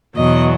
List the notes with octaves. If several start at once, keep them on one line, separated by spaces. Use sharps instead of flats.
E2 B2 F#3 D#5